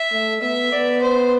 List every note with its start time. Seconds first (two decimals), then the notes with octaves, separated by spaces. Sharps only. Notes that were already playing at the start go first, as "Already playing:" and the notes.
Already playing: E5
0.12 A3
0.42 B3 E5
0.72 B3 D5
1.02 C5